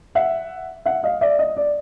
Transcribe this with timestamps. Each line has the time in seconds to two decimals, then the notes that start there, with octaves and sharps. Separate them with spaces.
0.15 E5 F#5
0.85 E5 F#5
1.03 D#5 F5
1.21 D5 E5
1.39 D#5
1.57 D5